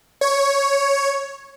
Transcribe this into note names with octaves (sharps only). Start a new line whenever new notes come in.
C#5